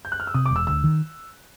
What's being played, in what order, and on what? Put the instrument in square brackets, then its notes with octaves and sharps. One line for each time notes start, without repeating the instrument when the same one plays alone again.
[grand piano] G6
F#6
F6
E6
[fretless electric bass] C3 [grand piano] D#6
[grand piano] D6
[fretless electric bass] E1
[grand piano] E6
[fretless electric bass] D2 [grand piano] E6
[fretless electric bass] D#3